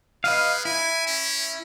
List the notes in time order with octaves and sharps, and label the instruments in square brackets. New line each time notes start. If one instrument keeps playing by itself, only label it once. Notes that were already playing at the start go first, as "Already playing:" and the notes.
[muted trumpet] G#3 [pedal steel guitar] B4 D#5 F5
[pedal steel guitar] E4 [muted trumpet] G#5
[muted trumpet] C#4